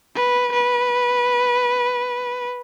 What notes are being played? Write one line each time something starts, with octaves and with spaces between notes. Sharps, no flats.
B4
B4